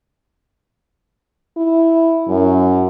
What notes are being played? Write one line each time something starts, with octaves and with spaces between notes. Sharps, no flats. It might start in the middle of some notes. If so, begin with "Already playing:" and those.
E4
F#2